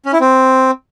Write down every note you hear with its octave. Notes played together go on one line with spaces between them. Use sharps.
C#4
E4
C4